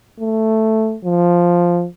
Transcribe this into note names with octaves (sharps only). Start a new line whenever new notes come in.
A3
F3